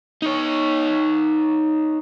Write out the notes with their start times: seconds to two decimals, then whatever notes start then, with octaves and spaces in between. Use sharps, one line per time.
0.22 D#4 C#5